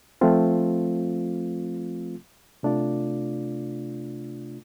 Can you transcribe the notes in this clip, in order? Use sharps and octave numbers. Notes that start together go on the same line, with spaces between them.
F3 A3 C4 F4
C3 A3 D4 F4 D5